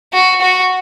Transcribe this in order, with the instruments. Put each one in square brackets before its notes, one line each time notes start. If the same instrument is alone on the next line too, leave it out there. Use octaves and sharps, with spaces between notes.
[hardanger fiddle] F#4
F#4